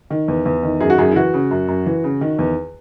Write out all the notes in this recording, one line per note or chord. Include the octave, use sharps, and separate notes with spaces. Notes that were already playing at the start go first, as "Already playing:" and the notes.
D#3
E2
E2
D#3
F#2 G#4
F#4
F#2 G#4
E4
E3 F#4
C#3
F#2
F#2
E3
C#3
D#3
E2